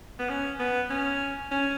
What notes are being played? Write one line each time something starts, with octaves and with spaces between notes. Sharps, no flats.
B3
C#4
B3
C#4
C#4